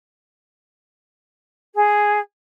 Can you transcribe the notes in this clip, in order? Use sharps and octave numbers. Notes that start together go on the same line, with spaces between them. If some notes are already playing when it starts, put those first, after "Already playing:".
G#4